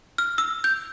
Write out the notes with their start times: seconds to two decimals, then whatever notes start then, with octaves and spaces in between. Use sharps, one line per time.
0.18 F6
0.38 E6
0.64 G6